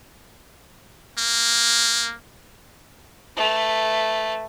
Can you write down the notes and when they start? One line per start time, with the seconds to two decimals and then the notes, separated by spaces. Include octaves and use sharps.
1.18 A#3
3.37 A3 B4